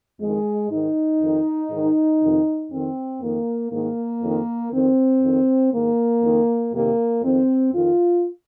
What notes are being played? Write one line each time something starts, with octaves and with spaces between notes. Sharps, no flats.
F2 D#3 G#3
G#2 D#3 D#4
F2 D#3
G#2 D#3
F2 C3 D#3
F2 D#3 C4
F2 D#3 A#3
G#2 D#3 A#3
F2 D#3
F2 D#3 C4
F2 D#3
G#2 D#3 A#3
F2 D#3
F2 C3 D#3 A#3
F2 D#3 C4
F2 D#3 F4